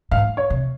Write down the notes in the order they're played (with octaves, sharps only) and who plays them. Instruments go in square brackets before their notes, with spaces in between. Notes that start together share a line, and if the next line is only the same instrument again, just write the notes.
[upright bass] G#2 [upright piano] F5
[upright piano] C#5
[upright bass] C3